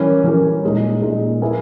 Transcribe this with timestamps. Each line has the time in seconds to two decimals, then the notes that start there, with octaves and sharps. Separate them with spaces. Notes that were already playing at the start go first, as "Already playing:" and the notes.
Already playing: E3 G3 C#4 G4 A#4
0.24 E3 G3 C#4 G4 A#4
0.63 A#2 G#3 D#4
1.02 A#2 G#3 D#4
1.42 A#3 E4 G#4 B4